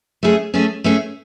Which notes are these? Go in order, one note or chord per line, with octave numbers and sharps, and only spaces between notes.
A3 C#4 G#4
A3 C#4 G#4
A3 C#4 G#4